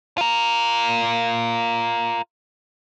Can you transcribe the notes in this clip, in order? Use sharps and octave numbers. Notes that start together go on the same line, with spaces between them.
F4 A#4